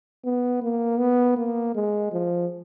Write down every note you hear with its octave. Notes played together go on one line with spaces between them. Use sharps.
B3
A#3
B3
A#3
G#3
F3